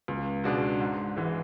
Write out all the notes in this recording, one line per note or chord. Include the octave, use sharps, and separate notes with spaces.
C#2
B2 G#3 D4 F#4
G#2
E3 G#3